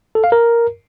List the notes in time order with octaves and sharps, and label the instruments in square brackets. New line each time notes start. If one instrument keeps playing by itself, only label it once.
[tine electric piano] A4
F5
A#4